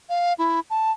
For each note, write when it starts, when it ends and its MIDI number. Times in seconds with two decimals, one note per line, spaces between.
0.09 0.33 77
0.38 0.60 64
0.70 0.91 81